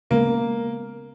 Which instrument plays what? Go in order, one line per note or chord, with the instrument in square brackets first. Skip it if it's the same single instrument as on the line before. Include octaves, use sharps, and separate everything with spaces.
[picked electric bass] C#3 G#3 B3 [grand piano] A#3